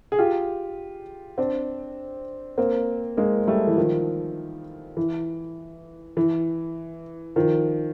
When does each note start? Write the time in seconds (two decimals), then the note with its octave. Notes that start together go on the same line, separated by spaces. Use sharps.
0.12 G#4
0.19 F4 G4
1.38 C4 D4
2.58 A#3 C4
3.17 G#3 A#3
3.47 G3 A3
3.67 E3
3.77 D#3 F3
4.97 E3
6.17 E3
7.36 D#3 F3